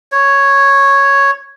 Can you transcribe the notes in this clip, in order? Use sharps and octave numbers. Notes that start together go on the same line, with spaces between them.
C#5